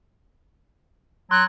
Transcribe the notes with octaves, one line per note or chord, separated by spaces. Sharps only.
F#3 C6 F#6